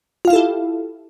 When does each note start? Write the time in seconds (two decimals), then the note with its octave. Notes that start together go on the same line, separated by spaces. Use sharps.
0.25 F4
0.28 F5
0.30 E4
0.33 A4
0.36 G4